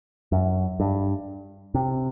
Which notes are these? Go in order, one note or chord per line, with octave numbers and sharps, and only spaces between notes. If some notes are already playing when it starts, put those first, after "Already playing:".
F#2
G2
C3